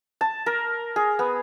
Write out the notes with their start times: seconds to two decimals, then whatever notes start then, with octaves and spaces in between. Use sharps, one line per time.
0.21 A5
0.46 A#4
0.96 G#4
1.19 B3